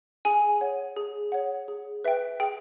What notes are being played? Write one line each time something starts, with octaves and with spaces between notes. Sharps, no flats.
G#4 G#5
C#5 F#5
G#4
C#5 F#5
G#4
B4 E5 G5
G#4 G5